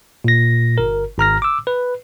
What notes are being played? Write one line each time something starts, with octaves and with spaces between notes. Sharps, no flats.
A#2 A#6
G1 A#4
G#1 A#5 F6 A#6
D6 E6
B4